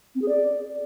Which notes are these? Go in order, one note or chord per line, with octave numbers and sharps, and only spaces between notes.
C4
G#4
D5